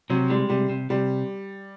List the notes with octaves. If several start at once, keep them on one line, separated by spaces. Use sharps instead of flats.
C3 F#3
G3 G#3
C3 G3
C3
C3 G3